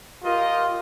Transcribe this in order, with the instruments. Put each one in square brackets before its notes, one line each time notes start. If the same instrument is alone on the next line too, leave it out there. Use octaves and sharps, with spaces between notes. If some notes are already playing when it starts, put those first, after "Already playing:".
[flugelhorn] F4 [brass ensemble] G4 A#4 D#5